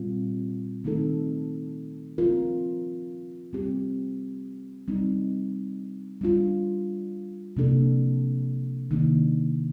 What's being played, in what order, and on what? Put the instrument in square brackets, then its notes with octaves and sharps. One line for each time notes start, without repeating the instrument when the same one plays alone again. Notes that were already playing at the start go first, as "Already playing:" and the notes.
Already playing: [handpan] A#2 G3 C4 F4
D#3 A3 C4 D#4 A4
F3 C4 F4 A#4
G3 C4 G4
G3 C4 D#4
G3 D4 F4
C3 F3 A#3 D4 A4
C3 D#3 A#3 D4